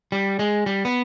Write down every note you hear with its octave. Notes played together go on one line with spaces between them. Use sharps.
G3
G#3
G3
B3